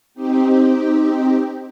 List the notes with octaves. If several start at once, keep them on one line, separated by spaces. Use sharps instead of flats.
C4 D#4 G4